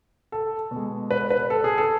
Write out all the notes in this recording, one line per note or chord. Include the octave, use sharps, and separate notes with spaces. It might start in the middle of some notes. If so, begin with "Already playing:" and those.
A4
B2
G#3
B4
B4
A4
G#4
A4